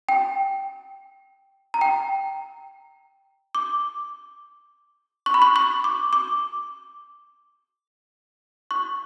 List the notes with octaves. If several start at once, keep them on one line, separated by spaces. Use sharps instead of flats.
G5
A#5
G5
D6
C#6
B5
C#6
C#6
D6
D6
C#6